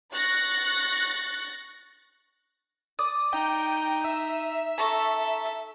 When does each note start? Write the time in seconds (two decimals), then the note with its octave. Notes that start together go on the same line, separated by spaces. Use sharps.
0.13 C#6 F#6 A6 A#6
2.99 D5 D#6
3.33 D#4 G5
4.04 E5
4.78 A4 A#5 C#6